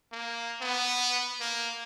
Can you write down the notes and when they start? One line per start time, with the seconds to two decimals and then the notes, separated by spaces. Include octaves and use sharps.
0.12 A#3
0.61 B3
1.40 A#3